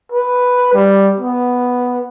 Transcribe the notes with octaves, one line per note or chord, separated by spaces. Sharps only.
B4
G3
B3